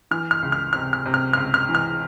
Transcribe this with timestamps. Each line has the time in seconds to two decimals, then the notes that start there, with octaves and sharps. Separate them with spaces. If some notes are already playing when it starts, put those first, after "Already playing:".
0.11 E3 F6
0.31 F6
0.43 C#2
0.52 F6
0.73 C3 F6
0.93 F6
1.06 C3
1.14 F6
1.33 C#2 F6
1.54 F6
1.69 E3
1.75 F6